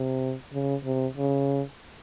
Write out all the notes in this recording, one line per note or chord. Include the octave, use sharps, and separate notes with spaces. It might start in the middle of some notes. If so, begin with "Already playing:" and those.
Already playing: C3
C#3
C3
C#3